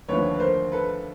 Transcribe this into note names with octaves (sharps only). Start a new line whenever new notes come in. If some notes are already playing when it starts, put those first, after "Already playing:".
D#2 D3 F3 A3 B4 C#5
B4
A#4 C5
A4 B4